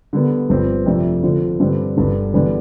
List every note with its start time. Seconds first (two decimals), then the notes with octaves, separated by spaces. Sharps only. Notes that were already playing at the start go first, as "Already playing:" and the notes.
0.13 D3 G3 B3
0.49 G1 G2 F3 C4
0.86 F2 C3 F3 A3 D4
1.23 D3 F3 C4
1.60 G2 D3 G3 C4
1.97 G1 G2 D3
2.34 E2 D3 G3 B3 D4